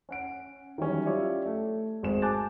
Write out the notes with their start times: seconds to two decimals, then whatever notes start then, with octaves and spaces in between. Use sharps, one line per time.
0.09 C#4 F#5 D7
0.78 D#3 E3 F#3 G3 C#4
1.06 E4 F4 G4 C#5 D5 E5
1.46 A3
2.03 G#1 G#3 F#4 C5 G#5 E7
2.22 G#5 A5 D6 F#6 G6 A6